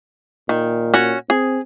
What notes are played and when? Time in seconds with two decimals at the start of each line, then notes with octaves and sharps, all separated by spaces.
0.49 A#2 D#3
0.94 C#4 F#4
1.30 C4 G#4